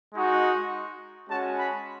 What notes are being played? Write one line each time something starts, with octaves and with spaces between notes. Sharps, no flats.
G#3 D#4 F#4
G#3 C#4 F#4 A5
B5